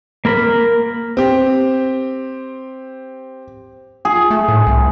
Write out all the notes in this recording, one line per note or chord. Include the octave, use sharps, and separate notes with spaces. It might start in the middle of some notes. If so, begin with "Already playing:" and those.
A#3 A#4 B5
C4 G4
G#4
A3
A2
C2